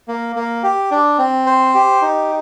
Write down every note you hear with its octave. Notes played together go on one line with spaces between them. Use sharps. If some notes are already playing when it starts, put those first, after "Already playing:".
A#3
A#3
G4
D4
C4
C5
G4
D#4